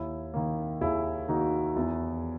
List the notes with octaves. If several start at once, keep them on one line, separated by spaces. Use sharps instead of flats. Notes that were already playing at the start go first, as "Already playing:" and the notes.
Already playing: D#2 E4
D#3 A#3
D#2 E4 G#4
D#3 A#3 D#4 F#4
E2 E4